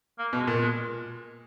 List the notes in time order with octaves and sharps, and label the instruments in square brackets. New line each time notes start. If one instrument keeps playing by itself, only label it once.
[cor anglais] A#3
[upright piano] B2
[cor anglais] G#3
[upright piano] A#2
[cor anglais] G#3